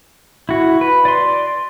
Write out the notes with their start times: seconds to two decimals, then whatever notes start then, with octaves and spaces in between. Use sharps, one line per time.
0.49 E4 F#4
0.81 B4
1.05 D5 C6